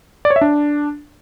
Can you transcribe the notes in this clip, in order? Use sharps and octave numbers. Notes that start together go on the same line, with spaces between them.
D5
C#5
E5
D4